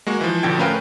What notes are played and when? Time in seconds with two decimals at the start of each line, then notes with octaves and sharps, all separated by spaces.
0.07 G#3 A#3 F#4
0.21 E3 F3
0.43 A1 B2 D3 F3 G5 G#6
0.58 A3 C#4 A#4 B4 F5 G5